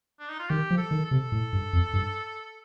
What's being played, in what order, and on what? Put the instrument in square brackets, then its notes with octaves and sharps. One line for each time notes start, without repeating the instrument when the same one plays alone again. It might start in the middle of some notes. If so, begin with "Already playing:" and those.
[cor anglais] D4
D#4
F4
[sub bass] D#3 [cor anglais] G4
[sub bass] F3
[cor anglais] A4
[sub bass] D#3
[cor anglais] A4
[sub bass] C3
A2
G2
F2
G2